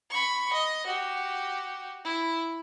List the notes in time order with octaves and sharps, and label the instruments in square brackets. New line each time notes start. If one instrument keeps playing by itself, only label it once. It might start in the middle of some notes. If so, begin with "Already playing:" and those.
[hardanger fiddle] B5 C#6
D#5
F#4 G4
E4